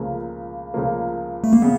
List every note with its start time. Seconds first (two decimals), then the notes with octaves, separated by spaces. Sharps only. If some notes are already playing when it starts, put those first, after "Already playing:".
Already playing: C#2 C#3 F3 A#3
0.74 C#2 C#3 F3 A#3
1.44 A3
1.53 A#3
1.62 C#3 B3